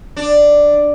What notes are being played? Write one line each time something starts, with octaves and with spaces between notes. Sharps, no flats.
D4